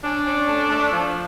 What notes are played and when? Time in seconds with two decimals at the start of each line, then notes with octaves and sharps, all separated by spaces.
0.03 C#4 D4
0.26 C#4
0.48 A3
0.70 A3
0.93 F3